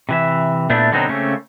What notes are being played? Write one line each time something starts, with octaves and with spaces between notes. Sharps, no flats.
C3 E3 E5
A#2 A3 B3 D4 E4
B2 D3 F#3 C4 D#4
C#3 A3 A#3 C4 C#4